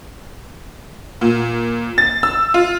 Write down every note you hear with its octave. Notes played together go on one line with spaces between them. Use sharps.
A#2
A6
E6
F4